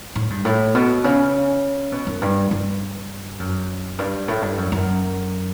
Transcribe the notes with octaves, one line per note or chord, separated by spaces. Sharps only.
A2
G2
A2
B2
C#3
B2
F#2
G2
G2
F#2
G2
A2
G2
F#2
F#2